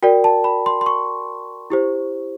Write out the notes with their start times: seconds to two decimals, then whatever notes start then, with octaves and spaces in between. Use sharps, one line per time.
0.03 F#4 A#4 D5 G5
0.24 A5
0.44 B5
0.66 C6
0.81 C6
0.86 C#6
1.70 E4 G4 C5